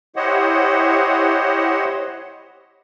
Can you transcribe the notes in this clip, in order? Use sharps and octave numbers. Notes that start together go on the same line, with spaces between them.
E4 G4 C5 C#5 D#5 F#5